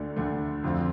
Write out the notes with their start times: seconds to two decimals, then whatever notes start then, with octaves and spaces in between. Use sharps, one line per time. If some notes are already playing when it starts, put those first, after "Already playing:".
Already playing: D2 D3 A3 D4
0.16 D2 D3 A3 D4
0.64 F2 D3 F3 C4